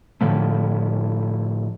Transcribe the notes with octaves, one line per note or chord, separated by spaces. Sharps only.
A2 D3 F3 A3